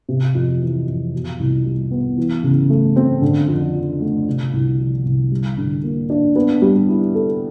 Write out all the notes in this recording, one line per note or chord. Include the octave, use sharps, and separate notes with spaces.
C3
F2
E3
F2
B2
C2
G3
B3
E3
C#3
A3
C4
D3
F2
F3
A3
C3
C2
F3
C2
G3
D3
A#3
D4
B3
G3
E4
A4